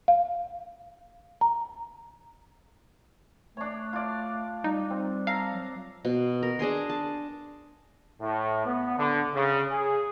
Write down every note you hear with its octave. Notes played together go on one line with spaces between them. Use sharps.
F5
A#5
A3 D4 C#5
F4 D5
G3 D#4
C4
A4 F5 A#5
F#3
B2
A#4
D4 G#4 G#5 C6
A5
A2
B3
D3
C#3
G#4